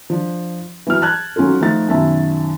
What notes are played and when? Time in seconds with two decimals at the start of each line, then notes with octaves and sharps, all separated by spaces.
0.10 F3 D4
0.87 E3 F#3 F6
1.02 A5 F#6 G#6
1.36 F#3 C#4 D#4 F4 A4
1.61 F3 A3 D#4 A6
1.88 B1 F#2 D#3 E5 A5